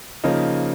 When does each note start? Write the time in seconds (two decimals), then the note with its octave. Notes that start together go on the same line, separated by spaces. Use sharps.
0.24 C#3 F3 A#3 D#4